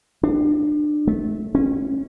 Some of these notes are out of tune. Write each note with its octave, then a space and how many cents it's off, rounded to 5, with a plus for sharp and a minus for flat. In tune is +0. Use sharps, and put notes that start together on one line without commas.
D4 +30
A3 -20
C#4 -25